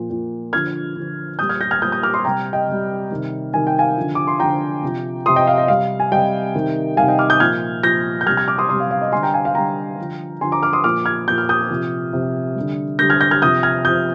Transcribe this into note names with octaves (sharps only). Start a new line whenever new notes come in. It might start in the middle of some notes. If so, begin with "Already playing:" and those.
Already playing: A#2 F3
A#2 F3
D3 F3 F6 G#6
D3 F3
A#2 G3 D#6 G6
F6 G#6
G6 A#6
F6 G#6
A#2 G3 D#6 G6
D#6 G6
D6 F6
C6 D#6
C3 G3 G5 A#5
D#5 G5
C3 G3
C3 D#3 G3
C3 D#3 G3 G#5
G5
F5 G#5
D3 F3
D6
C6
D3 F3 G5 A#5
C3 F3
C3 F3 C6 D#6
D#5 G5
F5
D#5
C3 G3 F5
G#5
C3 G3 D#5 G5
C3 D#3 G3
C3 D#3 G3 F5 G#5
D#5 G5
D6 F6
D#6 G6
A#2 F3 F6 G#6
A#2 F3 G6 A#6
G6
C3 G3 F6 G#6
F6 G#6
D6 F6
C6 D#6
C3 G3 C6 D#6
F5
F5
D#5
D3 G3 G#5 C6
G5 A#5
F5 G#5
F5
D3 G3 G5 A#5
D3 F3
D3 F3 G#5 C6
A#5 D6
D6 F6
C6 D#6
A#2 F3 D6 F6
F6 G#6
A#2 F3 G6
F6
D#6 G6
C3 F3
C3 F3
D3 G3
D3 G3 G6 A#6
F6 G#6
G6 A#6
F6 G#6
C3 F3 D#6 G6
F6 G#6
C3 F3 D#6 G6